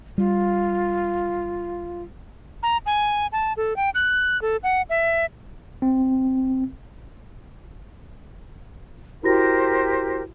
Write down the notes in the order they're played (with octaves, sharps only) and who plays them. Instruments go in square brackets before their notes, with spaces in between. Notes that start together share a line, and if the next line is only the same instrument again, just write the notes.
[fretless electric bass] G3 [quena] F4
[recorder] A#5
G#5
A5
A4
G5
F#6
A4
F#5
E5
[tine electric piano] C4
[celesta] E4 F#4 A#6 [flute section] G4 A#4 C5